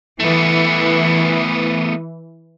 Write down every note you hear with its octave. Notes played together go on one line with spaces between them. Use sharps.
E3 A3 B3